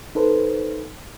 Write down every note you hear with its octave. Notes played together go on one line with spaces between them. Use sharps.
D#4 A4 B4 C5